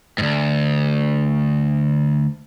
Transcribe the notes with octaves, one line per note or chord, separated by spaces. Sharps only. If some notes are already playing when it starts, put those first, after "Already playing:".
D2 G#2